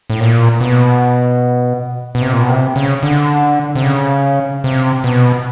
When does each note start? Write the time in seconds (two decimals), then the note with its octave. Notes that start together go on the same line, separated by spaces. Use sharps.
0.10 A2
0.20 A#2
0.61 B2
2.15 B2
2.22 C3
2.33 A#2
2.41 B2
2.49 C3
2.76 C#3
3.03 D3
3.76 C3
3.83 C#3
4.64 C3
5.04 B2